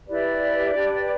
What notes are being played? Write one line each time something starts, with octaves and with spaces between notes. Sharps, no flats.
E4 G4 B4 D5
D4 G4 B4